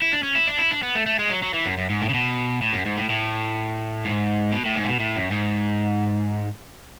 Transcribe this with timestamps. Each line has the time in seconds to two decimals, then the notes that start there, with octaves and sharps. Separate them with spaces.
0.02 E4
0.13 D4
0.23 C#4
0.35 E4
0.47 D4
0.58 E4
0.71 D4
0.83 B3
0.95 A3
1.06 A3
1.19 G#3
1.30 F#3
1.43 F#3
1.54 E3
1.66 F#2
1.78 F#2
1.90 G#2
2.02 A2
2.09 C#3
2.14 B2
2.62 A2
2.73 F#2
2.86 G#2
2.97 A2
3.10 A2
4.05 G#2
4.52 B2
4.65 A2
4.76 G#2
4.84 A2
4.89 B2
5.00 A2
5.16 F#2
5.32 G#2